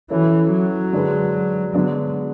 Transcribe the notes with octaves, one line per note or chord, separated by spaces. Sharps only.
E3 F#3 C#4 E4 A4
F#3
D3 G#3 D4 G#4 B4
D3 F#3 G#3 B3 D4